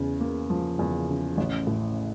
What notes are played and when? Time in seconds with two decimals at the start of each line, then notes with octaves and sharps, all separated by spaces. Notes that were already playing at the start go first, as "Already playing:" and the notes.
Already playing: E2 C#3
0.20 A#3
0.50 F3
0.79 E2
1.09 C#3
1.37 A1
1.67 A2